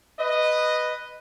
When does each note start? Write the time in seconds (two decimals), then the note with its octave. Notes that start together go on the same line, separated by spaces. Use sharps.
0.18 B4 D#5